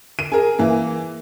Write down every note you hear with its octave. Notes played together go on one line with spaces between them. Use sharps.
D#7
G#4 A#4
E3 A#3